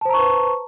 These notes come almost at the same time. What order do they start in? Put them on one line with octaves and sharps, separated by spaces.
A5 C5 A#5 C#6 B4